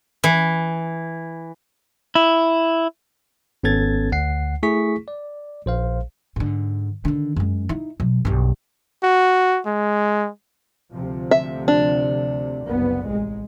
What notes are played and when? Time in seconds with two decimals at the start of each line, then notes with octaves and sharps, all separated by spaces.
0.24 E3
2.15 E4
3.63 G#1 B3 C#4 A4 G#6 A6
4.12 D2 F#5 C7
4.63 A3 E4 G#4 C#6 B6
5.08 D5
5.66 A#1 C5 F5
6.36 G#2 D3
7.05 D3 D#3
7.36 F#2 G#3
7.69 D#4 E4
8.00 B2 F#3
8.25 B1 G2
9.03 F#4
9.66 G#3
10.92 D2 C3 F3
11.31 E5
11.68 D4
12.65 F#1 C2 B3
13.07 A1 G#3